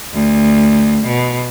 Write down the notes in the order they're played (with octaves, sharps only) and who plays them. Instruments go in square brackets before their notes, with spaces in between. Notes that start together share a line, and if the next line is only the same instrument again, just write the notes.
[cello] D2
B2